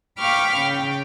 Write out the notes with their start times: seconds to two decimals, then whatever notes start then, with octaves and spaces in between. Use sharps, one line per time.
0.19 F5 G5 B5 C#6 D6 F6
0.58 C#3 G5